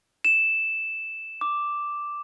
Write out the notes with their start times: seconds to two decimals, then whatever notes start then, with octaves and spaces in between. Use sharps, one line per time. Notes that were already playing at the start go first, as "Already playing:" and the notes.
0.25 E7
1.41 D6